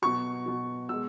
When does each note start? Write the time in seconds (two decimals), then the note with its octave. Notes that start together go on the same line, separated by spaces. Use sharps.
0.02 B2 F#3 C#6
0.46 B2 F#3
0.89 B2 G#3 E6